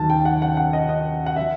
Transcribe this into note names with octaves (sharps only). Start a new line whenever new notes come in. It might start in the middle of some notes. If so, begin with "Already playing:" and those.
Already playing: D#2 D#3 F#3 A5
G5
F#5
F#5
F#5
D#5
D#5
F#5
F#3 E5